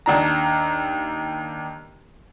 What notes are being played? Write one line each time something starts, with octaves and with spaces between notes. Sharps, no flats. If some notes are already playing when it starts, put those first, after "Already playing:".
D#2 D4 A#5